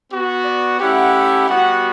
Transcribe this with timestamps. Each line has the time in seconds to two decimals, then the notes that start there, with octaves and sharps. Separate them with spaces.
0.10 B3 F#4
0.45 D5
0.79 A3 C#4 E4 G4 F#5
1.14 F#5
1.48 G3 B3 F#4 F#5